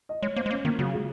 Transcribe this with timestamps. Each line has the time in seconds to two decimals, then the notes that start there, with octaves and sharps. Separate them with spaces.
0.09 D#5
0.22 G#3 C#5
0.36 A#3 C5
0.46 G#3
0.51 A#3 C#4
0.65 D#3 A#3
0.79 C#3 F#3
0.94 G#3